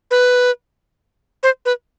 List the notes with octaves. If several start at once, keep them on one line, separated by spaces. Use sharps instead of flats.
B4
C5
B4